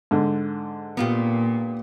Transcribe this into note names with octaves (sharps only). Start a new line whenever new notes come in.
G#2 D3
A#2 B3 F4 G4